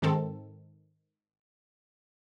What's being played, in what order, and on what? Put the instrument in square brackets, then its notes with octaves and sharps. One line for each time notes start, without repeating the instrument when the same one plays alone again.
[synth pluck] G#2 D#3 C4 A4